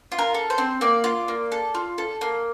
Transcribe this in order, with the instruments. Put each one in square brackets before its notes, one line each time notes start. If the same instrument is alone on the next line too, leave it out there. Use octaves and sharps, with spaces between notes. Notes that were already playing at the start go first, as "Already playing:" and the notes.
[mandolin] F4
A#4
A4
C5
C4
A#3 D5
F4
A#3
A4
F4
A4
A#3